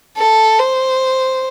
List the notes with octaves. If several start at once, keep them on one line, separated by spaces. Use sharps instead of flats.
A4
C5